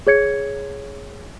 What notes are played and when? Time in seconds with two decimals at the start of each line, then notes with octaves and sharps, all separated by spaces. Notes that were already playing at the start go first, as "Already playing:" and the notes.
0.07 G#4 C#5 G#6 C#7